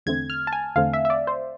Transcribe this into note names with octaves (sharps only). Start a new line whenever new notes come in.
E2 D3 A3 C4 G#6
F6
A5
G#5
E2 D3 A3 C4 F5
E5
E5
D5
C5